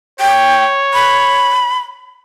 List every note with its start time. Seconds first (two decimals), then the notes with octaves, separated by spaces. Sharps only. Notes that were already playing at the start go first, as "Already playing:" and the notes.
0.20 C#5 G5
0.93 B5